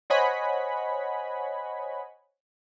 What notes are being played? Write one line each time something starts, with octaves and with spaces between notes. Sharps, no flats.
C5 C#5 D#5 F#5 G#5 B5